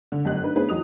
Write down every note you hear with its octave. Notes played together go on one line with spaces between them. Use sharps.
D3
G1 F#2 G4 D#5 F#6
D4 D#4 B4
B3 C#4 D4 G#4 B4 C5
E2 F#3 D#5 D#6 F7